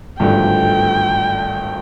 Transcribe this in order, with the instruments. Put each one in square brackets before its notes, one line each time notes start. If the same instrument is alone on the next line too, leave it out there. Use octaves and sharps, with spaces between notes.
[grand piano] G#1 G2 D3 F3 A3 [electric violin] G5